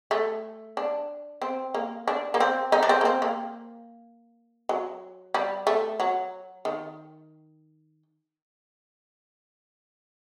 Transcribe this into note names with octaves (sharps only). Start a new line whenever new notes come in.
A3
D4
C4
A#3
D4
A#3
C4
D#4
D4
C4
A#3
C4
A#3
F#3
G3
A3
F#3
D#3